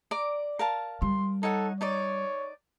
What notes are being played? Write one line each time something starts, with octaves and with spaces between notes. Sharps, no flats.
D5 A#5 D6
A#4 F5 A5
G3 C6
D#4 A4 C#5 F#5
D#4 C#5 D5 D6